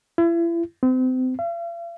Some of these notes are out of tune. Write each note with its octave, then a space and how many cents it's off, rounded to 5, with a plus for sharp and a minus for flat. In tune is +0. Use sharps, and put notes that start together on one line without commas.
E4 +35
C4 -35
F5 -45